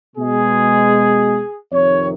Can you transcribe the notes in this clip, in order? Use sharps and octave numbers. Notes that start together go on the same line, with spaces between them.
B2 G#3 G#4
F2 C3 D#3 C#5